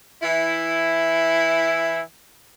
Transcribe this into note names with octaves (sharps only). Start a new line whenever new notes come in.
E3 E4